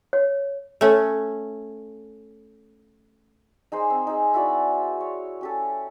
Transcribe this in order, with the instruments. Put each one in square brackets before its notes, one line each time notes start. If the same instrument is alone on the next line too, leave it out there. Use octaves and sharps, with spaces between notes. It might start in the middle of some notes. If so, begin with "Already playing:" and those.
[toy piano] C#5
[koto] A3 C#4
[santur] D#4 G#4 C5
C4
D#4 G#4
E4 F#4 D5
C#5
C#4 G4 A4